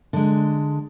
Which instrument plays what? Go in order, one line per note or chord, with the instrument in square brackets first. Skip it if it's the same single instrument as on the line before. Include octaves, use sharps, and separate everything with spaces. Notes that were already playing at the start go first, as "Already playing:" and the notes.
[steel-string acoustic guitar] D3 G#3